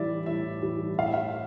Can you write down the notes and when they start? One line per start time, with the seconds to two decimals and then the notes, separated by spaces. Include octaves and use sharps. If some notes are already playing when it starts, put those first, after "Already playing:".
Already playing: A2 E3 G3 D5 E5
0.26 A2 E5
0.62 E3 G3
0.98 A2 F5
1.06 E5
1.14 F5